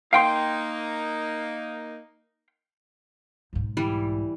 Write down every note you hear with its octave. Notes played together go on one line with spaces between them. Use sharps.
A#3 D#4 F5 G5 C6
B1 G#2
E3 G3